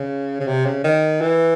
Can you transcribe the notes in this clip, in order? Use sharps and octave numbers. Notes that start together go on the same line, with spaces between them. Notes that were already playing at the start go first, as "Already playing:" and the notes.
Already playing: C#3
C#3
C3
C#3
D#3
E3